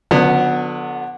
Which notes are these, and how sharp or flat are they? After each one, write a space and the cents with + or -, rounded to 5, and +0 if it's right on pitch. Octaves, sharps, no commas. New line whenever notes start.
D3 +10 F#3 -40 B3 +0